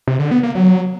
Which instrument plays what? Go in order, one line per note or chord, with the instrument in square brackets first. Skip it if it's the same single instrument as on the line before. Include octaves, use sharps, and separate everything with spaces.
[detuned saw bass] C3
D3
B3
A#3
F#3